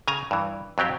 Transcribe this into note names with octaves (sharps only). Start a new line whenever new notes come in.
C#3 G#5 A#5
G2 E3
F2 F#3 C4 G4